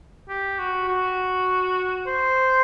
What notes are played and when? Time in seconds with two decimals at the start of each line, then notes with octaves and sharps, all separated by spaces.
0.29 G4
0.59 F#4
0.88 F#4
2.07 C5